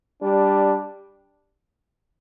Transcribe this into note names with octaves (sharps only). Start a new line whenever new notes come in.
G3 D4